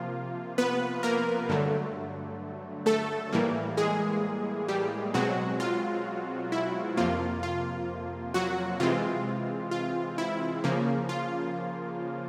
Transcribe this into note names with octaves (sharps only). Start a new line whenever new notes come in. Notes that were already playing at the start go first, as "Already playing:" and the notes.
Already playing: C3 F3 A#3 F4
B3 B4
A#3 A#4
G2 D3 F#3 A3
A3 A4
A2 E3 G3 A#3
G#3 G#4
G3 G4
B2 F#3 G#3 C4 F#4
F4
E4
F2 C3 F3 A#3 F4
F4
F#3 F#4
C3 E3 G#3 C4 F4
F4
E4
C#3 F3 A#3
F4